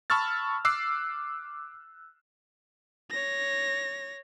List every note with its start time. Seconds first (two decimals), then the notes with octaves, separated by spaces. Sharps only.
0.10 A5 B5 C#6 E6 F6 A6
0.65 D6 E6 F#6 C7
3.10 C#5 A#6